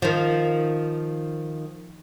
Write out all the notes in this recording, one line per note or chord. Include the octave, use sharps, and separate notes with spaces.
D#3 F3